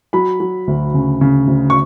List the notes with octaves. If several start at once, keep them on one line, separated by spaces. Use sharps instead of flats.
F#3 B5
F#3
D2
C#3
C#3
D2
C#6